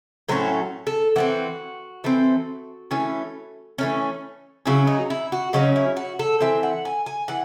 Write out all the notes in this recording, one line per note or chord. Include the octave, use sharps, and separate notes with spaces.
A2 F#3 A3 C#4 C5
A4
E3 A3 C4 F#4
E3 A3 C4
E3 A3 C#4
E3 A3 C#4
C#3 F#3 C#4 E4
D#4
E4
F#4
C#3 F#3 C#4 D#4
E4
F#4
A4
E3 C4 E5
F#5
G#5
G#5
E3 F#5